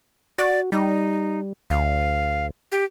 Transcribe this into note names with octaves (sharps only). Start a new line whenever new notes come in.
F#4 D5
G3 D#4
D2 F5
G4